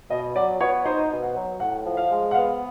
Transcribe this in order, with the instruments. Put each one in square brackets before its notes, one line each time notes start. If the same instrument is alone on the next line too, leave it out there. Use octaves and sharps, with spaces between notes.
[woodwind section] B2 [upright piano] D#5
[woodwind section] F#3 [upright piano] D5
[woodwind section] B3 [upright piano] C#5
[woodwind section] D#4 [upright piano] C5
[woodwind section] B2
[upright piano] F#5
[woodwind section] F#3
[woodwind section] A2 [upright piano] F#5
[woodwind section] F3
[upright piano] F5
[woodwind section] G#3
[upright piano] F#5
[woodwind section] B3 [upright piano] F5